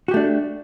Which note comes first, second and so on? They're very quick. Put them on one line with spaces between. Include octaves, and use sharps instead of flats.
F#4 G4 A3 D4